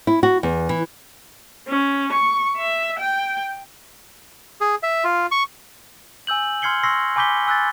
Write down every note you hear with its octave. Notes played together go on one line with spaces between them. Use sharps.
E4
F#4
E2
E3
C#4
C#6
E5
G5
G#4
E5
F4
C#6
G#5 E6 G6 F#7
C6 F6 G#6 C7 C#7 G7
C6 C#6 E6 A#6 C7
G#5 B5 D6 G6 B6 G7
G#5 E6 F#6 G6 A6